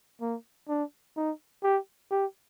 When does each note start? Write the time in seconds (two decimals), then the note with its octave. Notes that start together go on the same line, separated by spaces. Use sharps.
0.21 A#3
0.69 D4
1.17 D#4
1.64 G4
2.11 G4